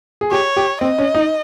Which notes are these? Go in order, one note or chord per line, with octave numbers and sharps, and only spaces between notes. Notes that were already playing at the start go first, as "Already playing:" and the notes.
G#4
G4 C#5
G4
C4 D#5
C#4
D#4